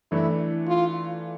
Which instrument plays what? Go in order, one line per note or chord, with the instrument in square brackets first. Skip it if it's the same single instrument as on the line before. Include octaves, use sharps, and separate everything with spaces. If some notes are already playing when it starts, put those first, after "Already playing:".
[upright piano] E3 A3 D4 [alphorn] E4
[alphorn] F4